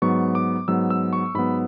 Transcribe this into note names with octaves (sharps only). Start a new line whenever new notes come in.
G#2 F#3 B3 C#6
D6
G#2 F#3 B3 E6
E6
C#6
G#2 F#3 B3 B5